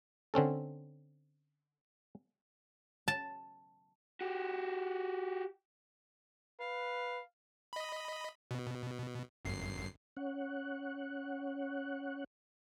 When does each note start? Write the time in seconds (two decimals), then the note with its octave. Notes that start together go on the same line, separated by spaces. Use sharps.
0.34 D3 C4 C#4 A4
3.08 A5
4.21 F#4 G4
6.61 B4 F5
7.73 D#5 B5
8.51 B2
9.45 G1 F#2 C7
10.17 C#4 F#5